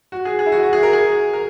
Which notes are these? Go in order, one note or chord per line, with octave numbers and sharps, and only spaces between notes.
F#4
G#4
G#4
E4
F#4
F#4
G#4
A#4
G#4
A#4